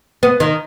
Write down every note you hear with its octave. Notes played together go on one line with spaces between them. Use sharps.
B3
D#3